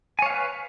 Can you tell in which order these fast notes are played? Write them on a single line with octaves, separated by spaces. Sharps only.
G#5 C#5 F5 B4